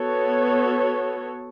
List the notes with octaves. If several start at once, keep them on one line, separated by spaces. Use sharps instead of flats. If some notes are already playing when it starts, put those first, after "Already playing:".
Already playing: B3 F#4 A4 C#5